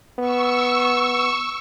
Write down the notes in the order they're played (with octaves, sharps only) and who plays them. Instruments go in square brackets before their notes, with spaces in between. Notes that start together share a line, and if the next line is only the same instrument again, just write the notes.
[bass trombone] B3 [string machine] C#6 E6